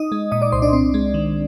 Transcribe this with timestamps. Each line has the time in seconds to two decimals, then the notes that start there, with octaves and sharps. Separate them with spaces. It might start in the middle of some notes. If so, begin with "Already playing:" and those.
Already playing: D#4 D#5 D#6
0.12 G#3
0.32 A#2 D#5 D#6
0.42 D5 D6
0.52 C2 C5 C6
0.62 D4 D5
0.73 C4
0.94 G#3
1.14 D#3